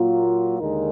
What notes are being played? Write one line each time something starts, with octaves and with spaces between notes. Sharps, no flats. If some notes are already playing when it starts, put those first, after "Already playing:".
Already playing: A#2 F#3 A#3 F4
D#2 D3 G#3 D#4 A#4